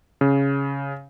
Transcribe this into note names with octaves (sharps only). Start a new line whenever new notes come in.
C#3